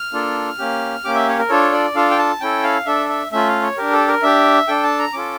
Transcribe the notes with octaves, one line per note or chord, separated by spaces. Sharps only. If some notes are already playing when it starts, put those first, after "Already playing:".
Already playing: F6
A#3 D4 F4 A4
A#3 C#4 G4
A#3 C#4 G4 D6
E5
C#5
A#4
D4 F4 A4 C#5
D5
D4 F4 A4 F5
G5
A5
C#4 E4 A4 G5
F5
D4 A4 E5
E5
A3 C#4 F4 E5
F5
C#5
D4 G4 A#4
A4
A#4
D4 G4 E5
D4 A4 G5
A5
A#5
C#4 F4 A4 D6